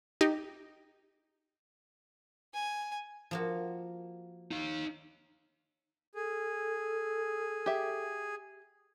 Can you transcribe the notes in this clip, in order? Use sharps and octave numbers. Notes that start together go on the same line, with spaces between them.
D#4 G4
G#5
F3 A#3 F#4
D#4 F5
G#4 A4
G4 E5